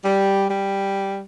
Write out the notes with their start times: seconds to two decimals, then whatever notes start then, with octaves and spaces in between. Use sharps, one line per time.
0.04 G3
0.50 G3